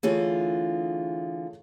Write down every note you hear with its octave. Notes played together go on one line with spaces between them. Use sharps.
D3 E3 A3 F4 G#4 C#5